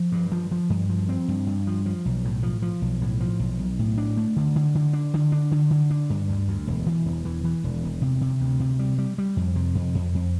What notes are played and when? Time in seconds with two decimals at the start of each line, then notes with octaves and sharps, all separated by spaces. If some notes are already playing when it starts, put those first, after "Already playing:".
Already playing: F3
0.12 G2
0.32 F3
0.51 F3
0.70 G2
0.89 F3
1.09 C4
1.28 G2
1.47 G2
1.67 F3
1.86 F3
2.05 B1
2.25 A2
2.43 F3
2.62 F3
2.82 B1
3.01 A2
3.20 F3
3.39 B1
3.59 B1
3.79 A2
3.98 D4
4.17 A3
4.36 D3
4.56 D3
4.75 D3
4.93 D4
5.14 D3
5.32 D4
5.51 D3
5.71 D3
5.91 D4
6.10 G2
6.28 D2
6.48 D2
6.67 E1
6.86 E3
7.05 E1
7.25 E3
7.44 E3
7.64 E1
7.84 E1
8.02 C3
8.21 C3
8.40 D2
8.60 C3
8.79 G3
8.98 G3
9.18 G3
9.37 F2
9.56 C3
9.75 F2
9.95 F2
10.15 F2